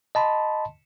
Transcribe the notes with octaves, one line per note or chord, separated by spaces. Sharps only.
D#5 A5 B5 C6